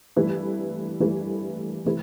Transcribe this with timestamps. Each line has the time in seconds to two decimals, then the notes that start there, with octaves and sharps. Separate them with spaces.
0.16 G2 E3 A3 E4 B4
1.00 G2 E3 A3 E4 B4
1.85 C3 E3 A3 E4 B4